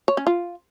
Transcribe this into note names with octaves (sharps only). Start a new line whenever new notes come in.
C#5
C#4
F4